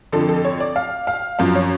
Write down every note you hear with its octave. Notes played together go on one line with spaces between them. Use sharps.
F2 D3 F3 A4
A4
C#5
D5
F5
F5
F#2 F3 F5
C#5